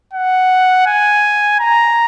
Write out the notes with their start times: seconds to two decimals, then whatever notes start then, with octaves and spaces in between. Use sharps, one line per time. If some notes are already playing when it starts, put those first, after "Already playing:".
0.13 F#5
0.86 G#5
1.60 A#5